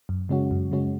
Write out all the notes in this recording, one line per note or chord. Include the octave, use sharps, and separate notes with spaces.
F#2
C#3 G#3 C#4 F#4
F#2
C#3 G#3 C#4 F#4